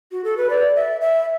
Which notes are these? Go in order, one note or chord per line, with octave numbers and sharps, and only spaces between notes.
F#4
A4
B4
D5
E5
E5